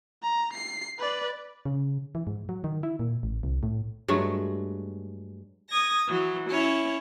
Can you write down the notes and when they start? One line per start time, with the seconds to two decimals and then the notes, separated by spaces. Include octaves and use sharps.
0.23 A#5
0.53 C7
0.99 B4 D5
1.66 C#3
2.15 E3
2.27 G#2
2.49 F#3
2.64 D#3
2.83 E4
2.99 A#2
3.23 A1
3.43 C2
3.63 A2
4.08 G2 F#3 G#3 A3
5.68 D#6 G#6 A#6
6.09 E3 F#3
6.49 C#4 E4 C#5